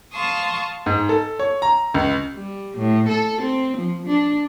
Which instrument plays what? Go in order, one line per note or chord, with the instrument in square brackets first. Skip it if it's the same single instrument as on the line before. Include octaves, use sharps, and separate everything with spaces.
[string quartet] F5 A5 C6 C#6 D#6
[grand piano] G#2
A4
C#5
A#5
C#2
[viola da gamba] G3
A2
A4
C4
F3
D4